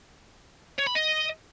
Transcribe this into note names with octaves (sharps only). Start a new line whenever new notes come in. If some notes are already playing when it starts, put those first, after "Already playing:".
C#5
B5
D#5